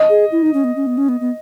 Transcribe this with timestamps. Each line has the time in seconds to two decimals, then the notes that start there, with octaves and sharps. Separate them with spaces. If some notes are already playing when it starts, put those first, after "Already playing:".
Already playing: D#5
0.09 G#4
0.32 E4
0.43 D#4
0.54 C#4
0.64 B3
0.76 C#4
0.87 B3
0.98 C#4
1.09 B3
1.20 B3